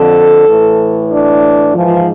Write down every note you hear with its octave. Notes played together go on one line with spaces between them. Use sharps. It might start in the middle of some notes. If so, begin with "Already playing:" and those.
Already playing: F2 D3 A4
A2 E3
D4
G#2 E3 F3